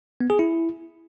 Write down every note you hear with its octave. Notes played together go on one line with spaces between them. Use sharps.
B3
G#4
E4